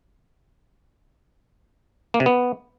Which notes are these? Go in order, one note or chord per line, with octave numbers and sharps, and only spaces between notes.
A#3
C3
B3